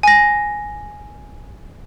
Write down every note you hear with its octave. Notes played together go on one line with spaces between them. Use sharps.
G#5 A#6